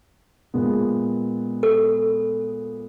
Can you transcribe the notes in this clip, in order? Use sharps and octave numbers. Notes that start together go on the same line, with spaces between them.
A#2 G#3 B3
A4